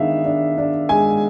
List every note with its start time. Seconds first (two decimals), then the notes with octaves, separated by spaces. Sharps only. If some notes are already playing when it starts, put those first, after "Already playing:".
Already playing: D#3 G#3 B3 D4 E5 F5
0.25 D4
0.57 D4
0.89 G#3 G#5